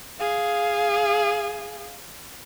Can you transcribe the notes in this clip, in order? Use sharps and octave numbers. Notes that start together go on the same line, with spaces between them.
G#4 F5